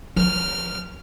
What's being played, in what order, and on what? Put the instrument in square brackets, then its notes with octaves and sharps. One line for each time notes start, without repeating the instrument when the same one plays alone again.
[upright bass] F3 [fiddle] F6